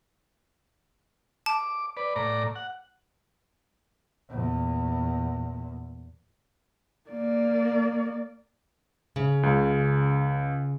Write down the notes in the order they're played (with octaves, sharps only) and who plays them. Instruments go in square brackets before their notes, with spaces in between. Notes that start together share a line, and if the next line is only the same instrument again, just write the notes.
[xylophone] A5 [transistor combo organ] D6
[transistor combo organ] B4 D5
A2 D5 A#5
F#5
[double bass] E2 A#2
[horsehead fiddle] A#3 D5
[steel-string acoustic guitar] C#3
[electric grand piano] C#2